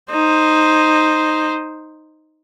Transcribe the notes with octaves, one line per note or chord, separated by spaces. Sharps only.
D#4 C5